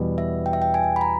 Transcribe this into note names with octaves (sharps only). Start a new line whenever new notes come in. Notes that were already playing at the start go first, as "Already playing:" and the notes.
Already playing: E2 B2 G3
E5
G5
E5
G5
G#5
B5
A#5